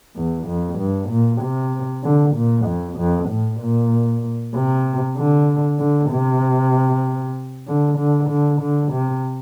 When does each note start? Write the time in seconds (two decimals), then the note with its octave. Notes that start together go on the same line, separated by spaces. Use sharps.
0.16 E2
0.47 F2
0.79 G2
1.09 A#2
1.41 C3
2.03 D3
2.35 A#2
2.66 F2
2.97 F2
3.29 A2
3.61 A#2
4.54 C3
5.17 D3
5.79 D3
6.10 C3
7.67 D3
7.98 D3
8.29 D3
8.61 D3
8.92 C3